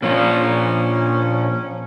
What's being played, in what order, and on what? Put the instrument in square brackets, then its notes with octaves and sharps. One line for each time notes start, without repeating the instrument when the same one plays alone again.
[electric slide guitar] A#2 F3 [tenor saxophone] C#4